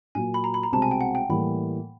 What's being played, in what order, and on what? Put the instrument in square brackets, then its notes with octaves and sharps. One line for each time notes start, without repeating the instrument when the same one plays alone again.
[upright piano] A#2 F#3 A#3 [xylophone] G#5
[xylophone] B5
A#5
B5
A#5
[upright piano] C2 B2 G#3 C4 [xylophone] A5
[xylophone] G#5
G5
F#5
G5
[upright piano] A2 E3 G3 A#3 [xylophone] B5